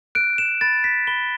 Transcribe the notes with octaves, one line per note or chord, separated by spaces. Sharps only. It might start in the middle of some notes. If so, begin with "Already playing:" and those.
F#6 D7
E7
B5 A6
B6
B5 G7